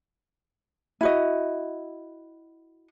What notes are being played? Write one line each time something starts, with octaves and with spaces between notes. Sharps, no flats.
E4 F#4 D#5